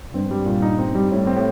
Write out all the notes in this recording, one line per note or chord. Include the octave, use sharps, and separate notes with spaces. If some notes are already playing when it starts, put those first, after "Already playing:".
G2 C4
G3
A#2
D#4
C4
G3
A2 E4
C4
A2